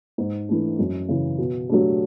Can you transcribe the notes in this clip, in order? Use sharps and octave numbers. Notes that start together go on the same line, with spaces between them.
G#2
E3 A3 D4
F#2
C#3 E3
B2
F#3 A3 D4 G4